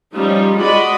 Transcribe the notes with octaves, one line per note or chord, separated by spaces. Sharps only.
F3 G3 C#4 D#4 F4
G#3 F#4 D5 D#5 B5